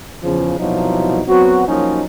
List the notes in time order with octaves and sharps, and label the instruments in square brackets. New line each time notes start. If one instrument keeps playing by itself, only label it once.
[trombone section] E2 C#3 F3
C2 B2 F3 F#3 D#4 E4
F#3 B3 C4 F#4
F3 F#3 A#3 C#4 D#4